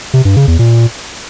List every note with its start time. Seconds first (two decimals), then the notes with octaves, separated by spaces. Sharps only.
0.14 C3
0.25 G2
0.36 C#3
0.48 E2
0.59 A#2